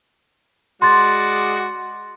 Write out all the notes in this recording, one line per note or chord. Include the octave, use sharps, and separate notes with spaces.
G#3 F#4 D5 C6 A6